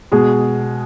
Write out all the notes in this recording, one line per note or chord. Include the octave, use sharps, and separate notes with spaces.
B2 G#3 G#4